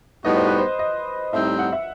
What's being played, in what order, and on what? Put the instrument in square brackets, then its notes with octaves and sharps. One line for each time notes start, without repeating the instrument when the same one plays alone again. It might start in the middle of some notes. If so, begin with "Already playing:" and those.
[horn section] A2 G3 B3 D#4 F#4 [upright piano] D#5
[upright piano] C5
B4
C5
D#5
[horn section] A2 G3 C4 D#4 [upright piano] E5
[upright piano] F#5
E5